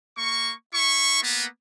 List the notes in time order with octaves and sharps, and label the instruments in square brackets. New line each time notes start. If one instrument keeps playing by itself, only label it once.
[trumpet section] A#3 C#6
E4 C#6
A#3 B3